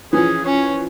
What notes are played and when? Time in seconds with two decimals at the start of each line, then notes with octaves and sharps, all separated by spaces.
0.13 E3 F3 C#4 G#4
0.45 C#4 C#5